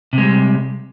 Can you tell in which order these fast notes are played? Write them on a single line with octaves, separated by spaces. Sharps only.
C3 G#3 G3